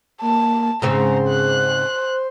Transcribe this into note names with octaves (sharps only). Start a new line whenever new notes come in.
A#3 A5
G#2 C#3 C4 C5 A#5
F#6